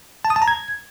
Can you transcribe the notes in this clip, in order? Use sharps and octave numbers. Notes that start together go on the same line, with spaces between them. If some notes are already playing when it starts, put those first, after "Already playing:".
A5
D#6
A5
A#5
G#6